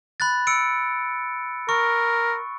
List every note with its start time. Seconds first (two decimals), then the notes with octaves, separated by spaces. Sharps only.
0.20 B5 F#6 A6
0.47 E6 C#7 D7
1.69 A#4 C#6